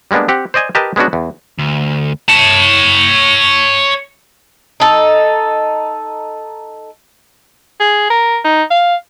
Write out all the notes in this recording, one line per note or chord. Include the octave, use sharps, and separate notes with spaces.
G3 G#3 A#3 B3 D4
C4 G4 F#5
C5 D5 D#5 G#5
G4 A#4 B4 D#5 A5
G#3 B3 C#4 D4 F#4
E2
D2
C#5 A5
D#4 A4
G#4
A#4
D#4
F5